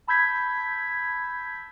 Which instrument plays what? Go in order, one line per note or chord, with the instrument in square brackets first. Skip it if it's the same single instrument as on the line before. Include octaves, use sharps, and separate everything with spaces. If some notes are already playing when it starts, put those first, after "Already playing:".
[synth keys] A5 B5 E6 G6 G#6 B6